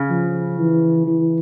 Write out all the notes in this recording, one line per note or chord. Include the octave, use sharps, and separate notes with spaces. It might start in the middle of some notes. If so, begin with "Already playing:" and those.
Already playing: C#3
F3
E3
E3